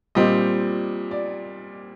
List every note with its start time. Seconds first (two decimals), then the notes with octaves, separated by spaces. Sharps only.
0.15 A#2 G3 C4 D#5
1.11 D5